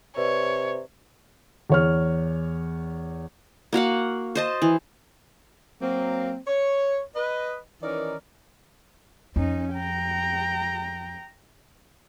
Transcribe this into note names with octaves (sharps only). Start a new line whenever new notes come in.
C3 B4 C#5 D5
E2 C#5 F6
A#3 F#4 F5 F#5
C5 D#5 A5
E3
F#3 A#3 C4
C#5
B4 D#5
D#3 E3 C#4 D#4 A#4 D5
F2 C#4 D#4
G5 A#5